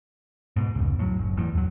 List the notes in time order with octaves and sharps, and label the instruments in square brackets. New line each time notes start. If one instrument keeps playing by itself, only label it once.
[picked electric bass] G#2 B2
F1 C#2
A2 F#3
F#1
E2 A2
D#2 F#3